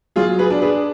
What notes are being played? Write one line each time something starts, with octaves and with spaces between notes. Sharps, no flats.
F#3 F4 G#4
G#4 B4
D4
G#4 B4